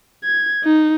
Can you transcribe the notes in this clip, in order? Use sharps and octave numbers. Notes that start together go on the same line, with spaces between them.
G#6
D#4